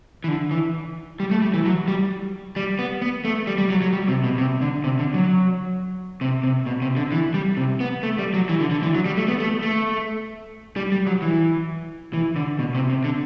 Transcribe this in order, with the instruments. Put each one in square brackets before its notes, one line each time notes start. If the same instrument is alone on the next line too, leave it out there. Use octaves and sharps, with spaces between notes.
[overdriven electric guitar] E3
D3
E3
G3
A3
G3
E3
F#3
G3
G3
B3
B3
A3
G3
G3
F#3
F#3
G3
C3
B2
C3
D3
C3
D3
F#3
C3
C3
B2
C3
D3
E3
G3
C3
B3
A3
G3
F#3
E3
D3
D3
E3
F#3
G3
A3
B3
A3
A3
G3
G3
F#3
E3
E3
D3
B2
C3
C3
D3